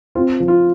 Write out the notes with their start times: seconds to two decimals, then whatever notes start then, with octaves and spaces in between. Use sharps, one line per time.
0.15 C4 F4
0.40 F3
0.48 F4